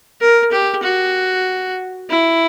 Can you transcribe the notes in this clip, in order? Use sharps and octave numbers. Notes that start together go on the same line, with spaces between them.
A#4
G4
F#4
E4